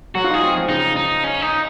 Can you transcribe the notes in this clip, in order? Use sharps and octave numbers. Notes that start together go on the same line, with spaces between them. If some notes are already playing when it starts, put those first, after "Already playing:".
F#3 F#4
F4
D#4
G#4
C4
F3
C#3 D#4
D#4
C#4
D#4